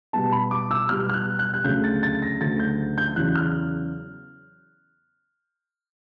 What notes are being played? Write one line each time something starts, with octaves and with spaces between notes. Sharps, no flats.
B2 G3 B3 A5
B5
D6
E6
B2 G3 B3 F6
F6
F#6
F#6
F#6
D2 C#3 F#3 A3 G6
A6
A6
A#6
D2 C#3 F#3 A3 A6
G6
G6
E2 C#3 F#3 F#6
F6